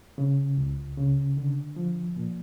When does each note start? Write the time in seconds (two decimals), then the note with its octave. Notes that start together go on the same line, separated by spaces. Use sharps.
0.18 C#3
0.58 C#2
0.97 C#3
1.37 D3
1.76 F3
2.16 A#2